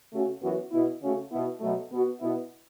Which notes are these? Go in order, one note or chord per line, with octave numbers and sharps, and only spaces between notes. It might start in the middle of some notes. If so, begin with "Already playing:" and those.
C#3 A3 C#4 F#4
F#2 E3 B3 F#4
B2 B3 E4
C#3 A3 C#4 F#4
B2 B3 E4
B2 F#3 A3
B2 B3 F#4
B2 B3 E4